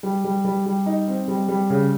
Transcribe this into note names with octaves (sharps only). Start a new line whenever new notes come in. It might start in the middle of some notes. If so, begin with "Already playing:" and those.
G3
G3
G3
G3
D#4
C4
G3
G3
C#3